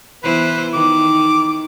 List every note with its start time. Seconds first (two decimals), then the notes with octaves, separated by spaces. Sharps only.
0.23 E3 B3 B4 C5
0.74 D#3 D6